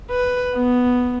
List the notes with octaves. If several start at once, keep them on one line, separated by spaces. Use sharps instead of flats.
B4
B3